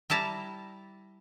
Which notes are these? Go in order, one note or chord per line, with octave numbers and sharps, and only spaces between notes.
G3 E4 A5 A#5